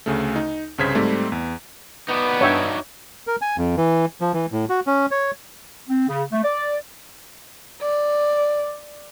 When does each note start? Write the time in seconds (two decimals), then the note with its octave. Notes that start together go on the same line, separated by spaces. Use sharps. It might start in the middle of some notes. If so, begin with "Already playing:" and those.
0.06 D2 C#3 A3
0.36 D#4
0.78 C2 G2 C#3 C5 G#6 B6
0.95 G#2 G3 A3 C4
1.32 E2
2.09 B3 D#4 F#4 D5
2.41 G2 C#5 E5 G5
3.27 A#4
3.42 G#5
3.58 F2
3.77 E3
4.21 F3
4.34 E3
4.52 A2
4.69 F#4
4.87 C#4
5.11 C#5
5.88 C4
6.08 C#3
6.32 A3
6.44 D5
7.81 D5